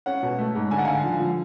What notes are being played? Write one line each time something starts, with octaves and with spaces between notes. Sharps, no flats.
C#4 F#5
B2
A3
G#2
D3 G#5
F#5
D3 F5 G#5
F3
F3